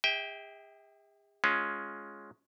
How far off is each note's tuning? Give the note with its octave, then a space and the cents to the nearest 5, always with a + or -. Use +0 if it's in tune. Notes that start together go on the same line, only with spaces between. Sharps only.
G#4 -45 E5 -35 G5 +0
G#3 +5 C#4 +0 F4 +0